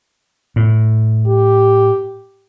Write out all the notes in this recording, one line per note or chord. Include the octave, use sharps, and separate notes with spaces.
A2
G4